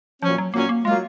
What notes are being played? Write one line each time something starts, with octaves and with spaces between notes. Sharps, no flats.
A#2 F3 F#3 C#4
F#3
A#2 F#3 A#3 C#4
A#3
F#3 G#3 A#3 F4